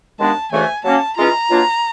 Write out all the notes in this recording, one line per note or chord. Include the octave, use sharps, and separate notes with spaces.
D#2 D#3 G#3 B3 D4 A5
D2 C#3 E3 A3 G#5
F#3 A#3 C#4 A5
E3 G#3 C#4 F4 A#5
B2 F#3 A#3 D4 F4